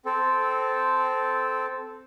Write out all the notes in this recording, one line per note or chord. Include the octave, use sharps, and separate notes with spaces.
C4 A4